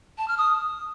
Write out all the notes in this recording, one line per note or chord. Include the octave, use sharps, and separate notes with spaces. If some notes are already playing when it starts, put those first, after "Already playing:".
A5
F6
D#6